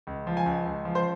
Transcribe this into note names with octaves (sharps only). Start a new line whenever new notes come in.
C#2
F3
G#5
C#2
C#2
F3
C5